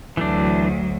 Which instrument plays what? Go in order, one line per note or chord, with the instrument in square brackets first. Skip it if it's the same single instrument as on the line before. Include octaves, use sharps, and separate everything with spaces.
[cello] D2 F#3 [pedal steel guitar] E3 A3 D4